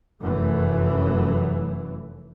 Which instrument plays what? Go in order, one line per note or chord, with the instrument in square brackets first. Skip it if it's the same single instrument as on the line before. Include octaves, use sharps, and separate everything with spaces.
[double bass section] F1 F#2 E3 A3